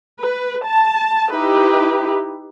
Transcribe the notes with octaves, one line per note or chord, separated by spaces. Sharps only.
B4
A5
D#4 E4 G4 B4